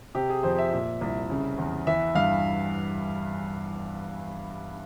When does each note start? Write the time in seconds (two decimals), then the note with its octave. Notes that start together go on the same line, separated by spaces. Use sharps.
0.15 C3 G4
0.30 G#4
0.43 F2 C5
0.58 E5
0.73 A#2
1.01 C2
1.30 C#3
1.58 E2
1.87 E3 E5
2.15 G2 F5